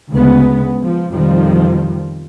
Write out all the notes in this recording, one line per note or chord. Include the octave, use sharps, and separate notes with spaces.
D2 C#3 G#3 B3
F3
F2 B2 D#3 F3 G3